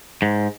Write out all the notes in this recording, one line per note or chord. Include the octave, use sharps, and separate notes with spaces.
G#2